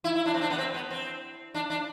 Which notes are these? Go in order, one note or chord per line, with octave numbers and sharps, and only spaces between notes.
E4
E4
D4
C4
D4
B3
C4
B3
C4
D4
D4